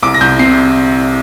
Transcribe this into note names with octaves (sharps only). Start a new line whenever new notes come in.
C2 D6
A#6
C2 G6
C3 C7